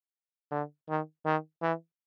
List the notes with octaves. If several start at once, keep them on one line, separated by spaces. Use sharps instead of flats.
D3
D#3
D#3
E3